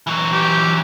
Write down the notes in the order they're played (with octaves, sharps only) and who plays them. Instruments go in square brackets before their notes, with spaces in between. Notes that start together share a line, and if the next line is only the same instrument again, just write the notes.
[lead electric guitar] E3 F#3
[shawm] G4